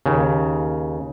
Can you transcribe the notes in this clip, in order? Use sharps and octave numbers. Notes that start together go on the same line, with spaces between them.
D#2 C#3